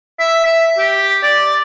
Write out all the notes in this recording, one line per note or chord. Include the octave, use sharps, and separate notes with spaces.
E5
E5
G4
D5